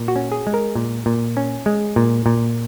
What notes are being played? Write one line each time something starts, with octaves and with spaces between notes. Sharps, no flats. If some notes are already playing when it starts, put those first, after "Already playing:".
Already playing: A#2
F#4
C#4
G#4
G#3
A#4
A#2
A#2
C#4
G#3
A#2
A#2